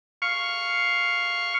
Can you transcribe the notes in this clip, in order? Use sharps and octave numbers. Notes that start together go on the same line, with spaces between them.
F5 C#6